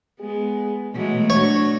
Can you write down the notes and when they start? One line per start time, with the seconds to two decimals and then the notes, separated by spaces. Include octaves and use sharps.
0.20 G#3 B3 G#4
0.94 B2 E3 F#3 G#3 A3
1.30 D4 F#4 C#5